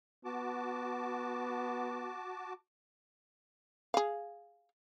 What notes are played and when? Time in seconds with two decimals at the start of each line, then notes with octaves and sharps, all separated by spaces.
0.25 B3 F#4 A5 D6
3.94 G#4 F5